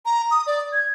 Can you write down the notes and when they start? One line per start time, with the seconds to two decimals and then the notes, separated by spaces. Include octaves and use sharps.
0.05 A#5
0.31 D#6
0.47 D5
0.73 G#6